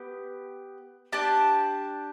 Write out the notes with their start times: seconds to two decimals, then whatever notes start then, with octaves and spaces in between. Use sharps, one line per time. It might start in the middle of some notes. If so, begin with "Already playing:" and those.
Already playing: B3 G4
1.12 D4 G4 A5